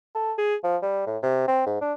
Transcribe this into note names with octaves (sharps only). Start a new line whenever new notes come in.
A4
G#4
F3
G3
A2
C3
C4
G#2
D4